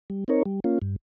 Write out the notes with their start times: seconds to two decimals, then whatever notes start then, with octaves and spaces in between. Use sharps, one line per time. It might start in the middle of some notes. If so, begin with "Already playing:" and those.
0.10 G3
0.28 C4 D#4 A#4 C#5
0.46 G3
0.64 A#3 C#4 F4
0.82 G2